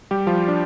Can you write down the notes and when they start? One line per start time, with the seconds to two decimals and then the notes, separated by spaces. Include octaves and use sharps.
0.11 G3 G4
0.27 F3 F4
0.48 D4